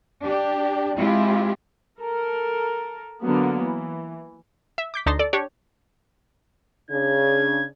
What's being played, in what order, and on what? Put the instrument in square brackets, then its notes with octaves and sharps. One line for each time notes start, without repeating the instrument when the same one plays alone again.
[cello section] D4 G4
G#3 C4 E4 F4 G4
[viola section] A4 A#4
D3 F#3 A#3 B3
E3
[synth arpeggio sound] E5
D6 G6 B6
D2 D4 D#4 A5 C6 A#6
A4 D5
D4 G4 C#5
[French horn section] C#3 D4 [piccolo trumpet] G#6